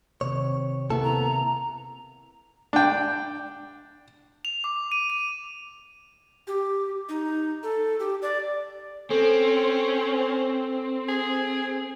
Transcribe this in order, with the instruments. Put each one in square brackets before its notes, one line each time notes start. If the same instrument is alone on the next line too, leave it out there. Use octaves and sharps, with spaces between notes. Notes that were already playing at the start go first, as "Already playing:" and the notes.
[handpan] C3 D#3 C4 [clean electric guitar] C#5
[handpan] C3 A#3 [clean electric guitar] B3 E4 A4
[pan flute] A#5
[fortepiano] D4 G5
[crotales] F7
D6
D#7
D#7
[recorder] G4
D#4
A4
G4
D5
[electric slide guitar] C4 [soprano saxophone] C#4 [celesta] A4
[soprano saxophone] G#4